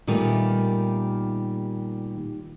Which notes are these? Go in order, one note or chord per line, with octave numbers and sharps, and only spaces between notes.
A#2 D#3 G3 A3 B3 D#4